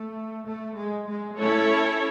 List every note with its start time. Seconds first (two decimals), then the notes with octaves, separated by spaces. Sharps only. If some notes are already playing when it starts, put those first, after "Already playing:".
Already playing: A3
0.45 A3
0.76 G#3
1.08 G#3
1.39 A3 C#4 E4 A4 C#5